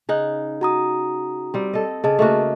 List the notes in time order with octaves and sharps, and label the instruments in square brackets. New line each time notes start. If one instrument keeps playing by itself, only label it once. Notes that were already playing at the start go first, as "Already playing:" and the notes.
[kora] C#3 D#4 F#5
[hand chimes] F#4 A#5 D#6
[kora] G3 C4
A4 D#5
[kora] C#3 [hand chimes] G#4 D#5 A5
[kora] A3 A#3 F#4 [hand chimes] D#5